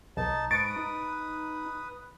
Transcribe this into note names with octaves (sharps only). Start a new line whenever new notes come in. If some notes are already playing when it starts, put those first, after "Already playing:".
B1 D#4 A5
G#2 B4 C#6 D#6 A6 D7
D#4